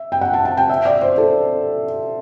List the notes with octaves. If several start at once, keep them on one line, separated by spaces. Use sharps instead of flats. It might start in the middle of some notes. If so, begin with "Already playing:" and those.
Already playing: E5
G5
F#5
A5
A5
G5
E5
D5
C5
A4